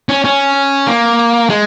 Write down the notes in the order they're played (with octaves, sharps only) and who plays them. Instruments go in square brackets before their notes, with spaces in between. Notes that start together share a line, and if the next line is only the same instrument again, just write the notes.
[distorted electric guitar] C#4
C#4
A#3
G#3